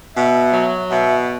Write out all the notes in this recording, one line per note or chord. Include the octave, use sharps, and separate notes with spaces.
B2 E5
F#3
B2 E5